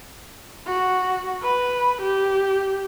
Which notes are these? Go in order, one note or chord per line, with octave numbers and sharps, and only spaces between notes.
F#4
B4
G4